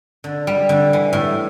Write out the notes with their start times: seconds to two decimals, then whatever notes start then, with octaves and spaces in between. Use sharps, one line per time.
0.24 D3
0.47 G3
0.69 D3
0.93 E3
1.13 A2